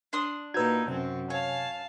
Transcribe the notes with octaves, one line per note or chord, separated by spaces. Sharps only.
D4 C6 D#6
A#2 D#4 F#4 B4 E6 G6 G#6
F#2 C3 C4 F#5
C#5 F5 G#5 A5